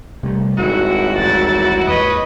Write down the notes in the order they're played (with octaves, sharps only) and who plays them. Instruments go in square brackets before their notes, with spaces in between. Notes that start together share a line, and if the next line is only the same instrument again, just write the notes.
[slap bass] C3 G3 A3
[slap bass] D#1 [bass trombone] G#1 [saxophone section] E4 F#4
[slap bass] A1 D2 G2 [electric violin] A6
[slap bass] D#2 G#2 [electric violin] B4 C#5 [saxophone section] D#5